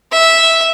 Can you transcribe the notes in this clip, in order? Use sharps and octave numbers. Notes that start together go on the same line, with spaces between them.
E5